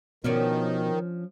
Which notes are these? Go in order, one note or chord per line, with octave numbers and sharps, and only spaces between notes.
B2 D#3 F3 C#4 D4